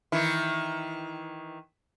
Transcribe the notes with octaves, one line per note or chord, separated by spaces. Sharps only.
D#3 E3 E4